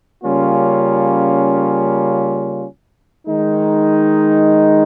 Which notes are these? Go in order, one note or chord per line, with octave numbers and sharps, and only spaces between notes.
C#3 G3 A#3 C#4 F4
D#3 G#3 D#4